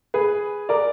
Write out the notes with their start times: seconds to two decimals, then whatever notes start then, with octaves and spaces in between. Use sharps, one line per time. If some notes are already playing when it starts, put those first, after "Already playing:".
0.14 G#4 B4
0.69 A#4 D5